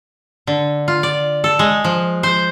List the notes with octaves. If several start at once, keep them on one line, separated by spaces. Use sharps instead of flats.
D3
F4
D5
A4
G#3
F3
C5